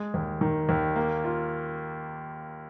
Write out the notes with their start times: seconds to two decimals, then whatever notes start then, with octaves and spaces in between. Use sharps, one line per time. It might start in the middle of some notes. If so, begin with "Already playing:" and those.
Already playing: G#3
0.14 D#2
0.41 D#3
0.69 D#2
0.96 A#3
1.24 F4